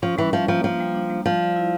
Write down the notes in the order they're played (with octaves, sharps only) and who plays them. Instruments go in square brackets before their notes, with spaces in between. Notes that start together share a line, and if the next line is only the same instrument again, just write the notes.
[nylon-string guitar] F3 [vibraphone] C#4
[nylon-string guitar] E3 [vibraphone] G3
[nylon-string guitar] F3 [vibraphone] C#4
[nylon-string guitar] F3 [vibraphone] A#3
[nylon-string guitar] F3 [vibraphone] D4
[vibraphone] G3
D4
G3
[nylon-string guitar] F3 [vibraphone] D5
[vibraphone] D5
E4